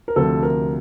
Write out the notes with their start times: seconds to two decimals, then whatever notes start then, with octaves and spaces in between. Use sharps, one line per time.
0.08 A#4
0.16 D2 C3 F3 A4
0.43 A#4